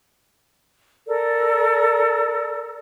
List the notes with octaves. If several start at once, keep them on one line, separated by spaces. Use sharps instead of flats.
A4 A#4 D5